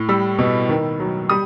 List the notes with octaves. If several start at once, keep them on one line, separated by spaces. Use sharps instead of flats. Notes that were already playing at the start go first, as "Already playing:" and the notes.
Already playing: A2
G3 E6
B2
D#3
F#3
G3 D#6